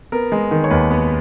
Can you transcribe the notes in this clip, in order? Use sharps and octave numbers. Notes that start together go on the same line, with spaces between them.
B3 A#4
G#3
D#3
C#5
D#2 B4
B3